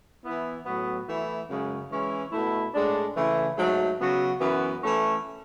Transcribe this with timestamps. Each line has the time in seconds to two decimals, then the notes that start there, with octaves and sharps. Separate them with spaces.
0.25 E3 B3 E4
0.66 A2 F#3 B3 F#4
1.08 E3 A3 E4
1.49 F#2 C#3 G#3 C#4
1.91 E3 G#3 C#4
2.32 B2 A3 E4
2.74 A2 G#3 D4
3.16 C#3 E3 A3 E4
3.57 G#2 F#3 A3
4.00 C#3 F#3 B3 F#4
4.40 F#2 E3 B3 F#4
4.82 E3 A3 C#4 E4